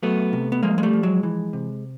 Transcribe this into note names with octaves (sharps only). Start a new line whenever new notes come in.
F#3 A3 B3
C3
B3
F3 G#3 A#3
G#3
G3 A3
F3
F#3 G#3
E3
C3